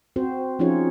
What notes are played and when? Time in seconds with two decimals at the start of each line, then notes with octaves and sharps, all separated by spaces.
0.16 C4 F#4 C5
0.59 F3 C#4 D#4 F4 G#4 C#5